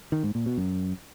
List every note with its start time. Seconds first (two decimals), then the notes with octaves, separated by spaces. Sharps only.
0.12 D#3
0.23 G#2
0.35 A#2
0.46 B2
0.58 F#2